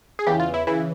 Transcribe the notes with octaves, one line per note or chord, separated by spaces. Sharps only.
G#4
E2 C#3 E3 G4
F4
E4
C#3 E3 E4